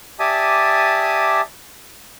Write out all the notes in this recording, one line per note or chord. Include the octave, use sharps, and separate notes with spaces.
G4 D5 E5 G#5 A5 D#6